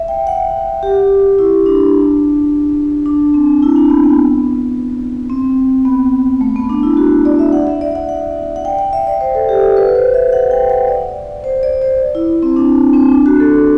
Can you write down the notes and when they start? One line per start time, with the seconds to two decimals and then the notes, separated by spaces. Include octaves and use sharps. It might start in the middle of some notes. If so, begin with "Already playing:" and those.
Already playing: E5
0.08 G5
0.27 F#5
0.83 G4
1.39 E4
1.66 D4
3.06 D4
3.34 C4
3.62 E4
3.76 D4
3.90 B3
4.04 B3
5.30 C4
5.85 B3
6.41 A3
6.56 B3
6.69 D4
6.83 E4
6.97 F#4
7.25 D5
7.39 E5
7.53 F#5
7.67 E5
7.81 D5
7.95 F#5
8.09 F#5
8.56 F#5
8.65 G5
8.79 F#5
8.93 E5
9.07 D5
9.21 C5
9.35 A4
9.49 G4
9.63 A4
9.77 B4
9.95 C5
10.14 E5
10.33 F#5
10.51 G5
10.70 F#5
10.89 D5
11.44 C5
11.63 D5
11.82 C5
12.15 E4
12.42 C4
12.56 D4
12.93 C4
13.12 D4
13.26 F#4
13.40 A4
13.54 A4